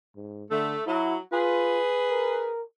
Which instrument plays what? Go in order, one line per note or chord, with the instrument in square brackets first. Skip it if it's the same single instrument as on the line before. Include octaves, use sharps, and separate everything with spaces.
[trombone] G#2
[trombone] D3 [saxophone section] A3
[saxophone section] F#3 [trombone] E4
[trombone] F4 [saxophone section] G#4 B4
[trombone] A#4